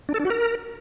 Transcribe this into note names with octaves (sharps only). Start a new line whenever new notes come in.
D4
A4
D4
F#4
A#4